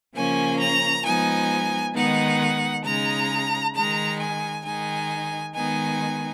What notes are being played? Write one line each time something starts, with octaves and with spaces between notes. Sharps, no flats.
C#3 F3 A#3 C#4 G#5
A#5
F3 G#3 B3 D#4 G#5
D#3 G#3 B3 D#4 F#5
C#3 G#3 D#4 A#5
D#3 G#3 D#4 A#5
G#5
D#3 G#3 D#4 G#5
D#3 G#3 B3 D#4 G#5